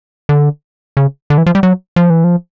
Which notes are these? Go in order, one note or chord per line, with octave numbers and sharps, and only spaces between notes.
D3
C#3
D3
E3
F3
G3
F#3
F3
E3
F3